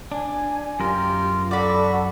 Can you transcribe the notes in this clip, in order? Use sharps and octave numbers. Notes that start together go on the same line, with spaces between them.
D4 G#5
F#2 F4 G4 A#4
F#4 A4 D5 B5